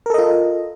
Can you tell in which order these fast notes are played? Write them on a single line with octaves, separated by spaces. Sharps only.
A#4 A4 D#5 F4